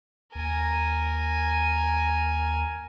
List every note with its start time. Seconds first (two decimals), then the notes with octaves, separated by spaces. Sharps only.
0.35 D#2 A#4 G#5